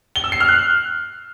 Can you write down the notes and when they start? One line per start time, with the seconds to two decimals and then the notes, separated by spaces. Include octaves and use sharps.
0.16 G7
0.24 E6
0.32 C7
0.40 F6
0.49 F#6